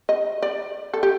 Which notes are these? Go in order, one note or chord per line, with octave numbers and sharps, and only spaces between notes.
D#5
D5
A4
G4